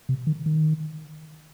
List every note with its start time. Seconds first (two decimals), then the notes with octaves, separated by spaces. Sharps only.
0.09 C3
0.27 D#3
0.46 D#3